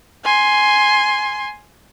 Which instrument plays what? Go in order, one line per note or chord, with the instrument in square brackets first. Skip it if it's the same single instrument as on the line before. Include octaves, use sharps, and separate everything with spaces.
[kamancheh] G#5 C6